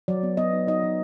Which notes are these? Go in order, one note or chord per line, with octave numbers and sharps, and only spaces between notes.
F#3 D5
B3
B3 D#5
D#4
D#4 D#5
F#3